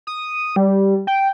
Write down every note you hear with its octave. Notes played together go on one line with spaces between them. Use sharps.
D#6
G3
G5